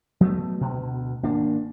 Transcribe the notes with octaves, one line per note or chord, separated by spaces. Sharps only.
F#3 G#3 A3 B3
D2 B2
G#1 A#3 D4